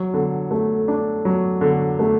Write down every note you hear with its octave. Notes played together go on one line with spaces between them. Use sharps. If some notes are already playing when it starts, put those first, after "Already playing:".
Already playing: F#3
D3
A3
D4
F#3
D3
A3